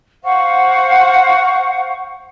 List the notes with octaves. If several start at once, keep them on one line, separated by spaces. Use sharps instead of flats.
C5 F5 F#5 C#6